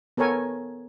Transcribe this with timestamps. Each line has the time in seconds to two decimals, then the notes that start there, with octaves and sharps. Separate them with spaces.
0.17 B3 A4 A#4 C#5 G#5